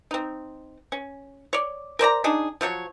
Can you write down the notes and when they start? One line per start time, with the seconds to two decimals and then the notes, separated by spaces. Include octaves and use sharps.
0.11 C4 D#4
0.92 C#4
1.53 C#5 D5
1.99 A#4 C5 D5 A#5
2.24 D4 D#4 G#4
2.61 F3 F#3 F#4 C#5